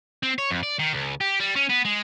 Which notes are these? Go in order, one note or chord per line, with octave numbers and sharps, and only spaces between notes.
C4
C#5
F2
D5
D#3
C#2
G4
G3
C#4
B3
G#3